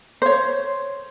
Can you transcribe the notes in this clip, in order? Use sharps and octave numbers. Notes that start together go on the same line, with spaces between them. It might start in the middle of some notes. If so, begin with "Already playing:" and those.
C5 C#5